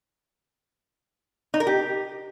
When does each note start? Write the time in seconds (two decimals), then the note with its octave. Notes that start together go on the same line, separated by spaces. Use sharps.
1.54 D#4
1.60 A#4
1.67 G4